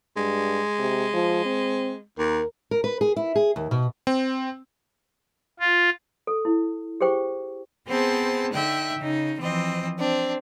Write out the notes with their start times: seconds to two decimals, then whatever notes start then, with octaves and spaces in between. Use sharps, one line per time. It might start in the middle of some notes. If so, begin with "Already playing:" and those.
0.16 G2 G#3
0.80 C3
1.13 F3
1.45 C4
2.18 D#2 A#4
2.71 A#4
2.84 B4
3.01 G#4
3.16 E4
3.36 G#4
3.56 D#2
3.71 B2
4.07 C4
5.60 F4
6.27 A4
6.45 E4
7.01 G4 G#4 C5 G5 C#6
7.87 B3 C4 G#4 C5 A5
8.53 D3 D#4 E5 G5 F#6
8.99 C#3 D#4
9.40 E3 F3 C4 D#5
9.98 C4 D4